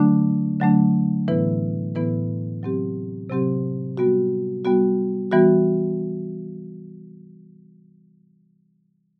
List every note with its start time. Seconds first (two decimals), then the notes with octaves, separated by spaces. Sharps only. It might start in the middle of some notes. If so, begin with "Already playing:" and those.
Already playing: D3 F#3 A3 D4
0.60 D3 F#3 A3 D4
1.28 A2 E3 B3 E4 B4
1.95 A2 E3 B3 E4 B4
2.62 C3 F#3 C4 G4
3.30 C3 F#3 C4 G4
3.97 G3 B3 F#4
4.65 G3 B3 F#4
5.32 E3 G3 B3 F#4